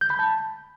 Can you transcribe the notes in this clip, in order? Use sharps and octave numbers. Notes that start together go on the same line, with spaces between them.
G6
B5
A5